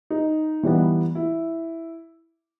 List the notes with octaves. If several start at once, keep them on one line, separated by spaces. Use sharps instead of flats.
D#4
E3 G3 B3
E4